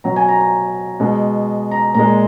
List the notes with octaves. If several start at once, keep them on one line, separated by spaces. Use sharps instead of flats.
B2 F#3 A#5
G#5
A#5
A#5
B2 G#3
A#5
A#2 G#3 A#5